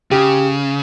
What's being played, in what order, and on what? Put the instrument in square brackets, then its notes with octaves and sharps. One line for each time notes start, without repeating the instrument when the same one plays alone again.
[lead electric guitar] C#3 [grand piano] G4